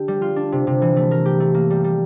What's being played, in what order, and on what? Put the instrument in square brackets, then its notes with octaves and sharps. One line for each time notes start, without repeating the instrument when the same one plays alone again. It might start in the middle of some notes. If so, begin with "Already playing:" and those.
Already playing: [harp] D3 G4
G3
F4
D4
C3
C3
E3
A3
A#4
G4
A3
A#3
G3
G3